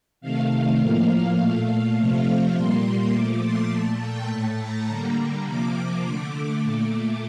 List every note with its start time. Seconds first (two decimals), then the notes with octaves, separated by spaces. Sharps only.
0.21 C3 D#3 A3 F5
0.79 A2 F3 A#3
1.37 A#2 A3
1.96 C3 F3 A3
2.54 A#2 G3 A#3 C6
3.13 A#2 F3 A3 D6
3.42 C6
3.71 A#2 A3 A5
4.01 G5
4.30 A2 A3 A5
4.59 A#5
4.88 D3 G3 A#3
5.46 C3 F3 A#3 D6
5.75 D6
6.05 D3 A3 D6
6.63 A#2 A3 D6